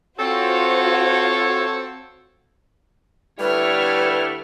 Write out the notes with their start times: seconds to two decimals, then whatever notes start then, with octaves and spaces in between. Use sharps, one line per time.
0.19 C4 F4 F#4 A4 C5 C#5
3.40 D3 G3 A3 E4 B4 C#5 F6